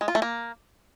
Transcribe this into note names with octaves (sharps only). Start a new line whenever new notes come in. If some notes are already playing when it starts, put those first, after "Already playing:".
G#3
F4
A3
A#3